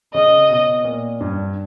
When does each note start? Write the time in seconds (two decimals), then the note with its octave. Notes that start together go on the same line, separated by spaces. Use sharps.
0.14 C#3 D#5
0.50 B2
0.85 A#2
1.21 G2